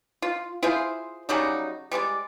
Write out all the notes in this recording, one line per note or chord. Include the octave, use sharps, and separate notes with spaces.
F4
E4 F4 G#4 C5
C#3 F#3 G3 D#4
G3 G#3 C#5 D5